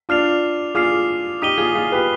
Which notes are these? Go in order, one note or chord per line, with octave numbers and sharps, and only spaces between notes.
D4 F4 D6 F6 C7 F7
F4 G#4 D6 F6 C7 F7
D#4 G4 D#6 B6 D#7 G7
F4 G#4
F4 G#4
G4 B4